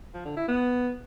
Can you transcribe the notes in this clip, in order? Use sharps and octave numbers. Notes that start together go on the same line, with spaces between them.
F3
D3
E4
B3